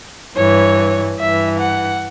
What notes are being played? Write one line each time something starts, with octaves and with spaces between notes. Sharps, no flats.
G2 E3 C#5
G2 E3 E5
F#5